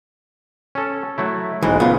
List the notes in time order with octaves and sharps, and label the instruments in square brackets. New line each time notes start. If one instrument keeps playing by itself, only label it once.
[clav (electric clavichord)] C#4 A4
F#3 A3 E4
[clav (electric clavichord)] B1 G#2 G#3 [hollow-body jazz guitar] E3
[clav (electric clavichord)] A#2 C#3 [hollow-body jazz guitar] B3 F4